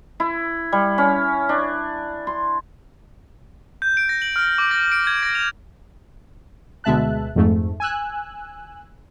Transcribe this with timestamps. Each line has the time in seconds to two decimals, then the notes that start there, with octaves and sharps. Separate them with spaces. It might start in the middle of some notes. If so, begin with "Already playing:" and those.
0.20 E4
0.72 G3
0.98 C#4
1.49 D4
2.27 C6
3.82 G6
3.97 D7
4.09 A#6
4.22 F#7
4.36 F6
4.58 D6
4.71 A#6
4.92 D7
5.07 G#6
5.23 A#6
5.35 F7
6.84 D2 B2 G#3 E5 A5 F#6
7.36 F2 G#2 A3
7.80 G#5 E6 F#6